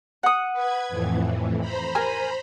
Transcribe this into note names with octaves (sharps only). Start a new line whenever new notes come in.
F#5 D#6
B4 G#6
F2 A2 E3
C5 A#5 B5
A#4 G#5 F6